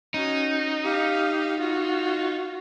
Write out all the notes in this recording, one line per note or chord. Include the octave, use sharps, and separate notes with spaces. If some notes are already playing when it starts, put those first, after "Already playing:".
C#4 D#4 F#4
G4 F5
F4 F#4